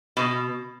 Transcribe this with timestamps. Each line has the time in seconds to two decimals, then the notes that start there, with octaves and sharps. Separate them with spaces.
0.17 B2